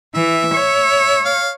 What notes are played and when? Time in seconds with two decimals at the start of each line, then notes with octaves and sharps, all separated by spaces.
0.15 E3 E5
0.54 C#5
1.25 F5